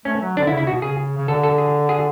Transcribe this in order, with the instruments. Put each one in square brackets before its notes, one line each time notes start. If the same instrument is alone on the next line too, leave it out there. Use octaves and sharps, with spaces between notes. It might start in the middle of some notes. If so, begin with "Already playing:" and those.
[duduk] A3 [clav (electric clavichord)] C#4
[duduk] F#3
[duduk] D3 [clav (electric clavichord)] D4
[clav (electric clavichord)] E4
[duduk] C#3
[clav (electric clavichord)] E4
[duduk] B2 [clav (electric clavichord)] F#4
[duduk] C#3 [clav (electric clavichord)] G#4
[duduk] C#3
[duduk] D3 [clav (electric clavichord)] A4
[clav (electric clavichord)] A4
G#4
G#4